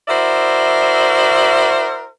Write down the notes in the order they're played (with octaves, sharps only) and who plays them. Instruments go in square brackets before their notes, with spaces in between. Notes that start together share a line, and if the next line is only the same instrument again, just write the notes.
[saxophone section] E4 F#4 A#4 C5 D5 E5